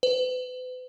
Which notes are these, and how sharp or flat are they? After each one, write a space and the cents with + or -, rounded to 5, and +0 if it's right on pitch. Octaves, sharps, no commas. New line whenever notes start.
B4 +40